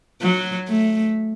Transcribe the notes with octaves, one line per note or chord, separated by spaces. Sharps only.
F#3
A3